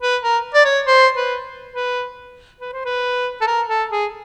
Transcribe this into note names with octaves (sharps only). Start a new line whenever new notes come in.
B4
A#4
D5
C#5
C5
B4
B4
B4
C5
B4
A4
A#4
A4
G#4